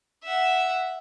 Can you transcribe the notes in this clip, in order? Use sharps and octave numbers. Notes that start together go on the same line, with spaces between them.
E5 F#5